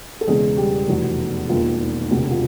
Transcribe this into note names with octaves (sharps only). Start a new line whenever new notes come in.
A4
E1 E2 C#3 G#3 G#4
G3 G4
F1 E2 B2 F#4
E1 D#2 D#3 F4
E1 D2 C3
F4